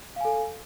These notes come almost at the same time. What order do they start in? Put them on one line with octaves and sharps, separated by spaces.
F5 G#5 A4